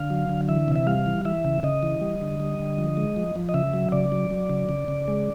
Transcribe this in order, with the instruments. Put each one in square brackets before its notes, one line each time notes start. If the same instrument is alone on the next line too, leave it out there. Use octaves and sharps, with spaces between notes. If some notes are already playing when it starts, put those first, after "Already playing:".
Already playing: [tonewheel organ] D3 F5
F#3
D3
E3 E5
C3
E5
G3 F5
E3
E3 E5
C#3
C#3 D#5
E3
G3
D3
G3
D3
F3
G#3
F3
F3
D#5
C#3 E5
F#3
C#3 D5
F#3
F#3
C#3
C#3
C#3
G#3